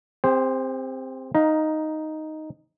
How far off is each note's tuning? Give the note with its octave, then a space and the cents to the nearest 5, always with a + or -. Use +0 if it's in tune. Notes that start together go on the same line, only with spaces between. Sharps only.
C4 +0 G4 +45 C5 +0
D#4 +0 F5 +25 A#5 +20